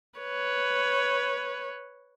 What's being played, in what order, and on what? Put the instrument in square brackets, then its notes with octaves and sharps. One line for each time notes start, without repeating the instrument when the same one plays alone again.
[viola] B4 C#5